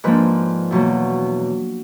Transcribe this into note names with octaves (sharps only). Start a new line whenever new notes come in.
G#2 F3 A#3 D4 B4
E2 B2 F#3 A#3